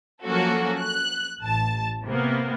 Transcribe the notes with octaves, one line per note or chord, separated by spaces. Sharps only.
F3 F#3 A#3 C#4 F#4 A4
F#6
A1 A5
C3 A#3 B3